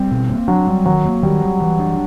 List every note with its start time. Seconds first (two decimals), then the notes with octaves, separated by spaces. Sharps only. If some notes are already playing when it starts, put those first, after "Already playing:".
Already playing: G3 C4
0.11 B2
0.30 A#3
0.48 F#3 D4
0.67 G3
0.86 D#3 F#3
1.05 A#3
1.23 D#3 G3
1.42 F#3
1.60 E3
1.79 D4